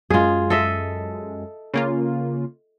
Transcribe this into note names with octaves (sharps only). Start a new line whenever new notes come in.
F#2 G#3 F4 G#4
A4 D#5 E5
C#3 A#3 F4